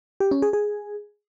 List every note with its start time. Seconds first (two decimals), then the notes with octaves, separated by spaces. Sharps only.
0.20 G4
0.31 C#4
0.42 G#4
0.53 G#4